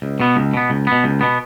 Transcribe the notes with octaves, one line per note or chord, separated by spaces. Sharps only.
C#2
B2 B3
C#2
B2 B3
C#2
B2 B3
C#2
B2 B3